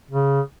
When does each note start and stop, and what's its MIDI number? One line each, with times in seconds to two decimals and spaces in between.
0.11 0.41 49